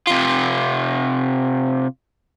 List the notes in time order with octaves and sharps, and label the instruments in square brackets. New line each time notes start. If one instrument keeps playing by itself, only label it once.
[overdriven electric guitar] C3 F4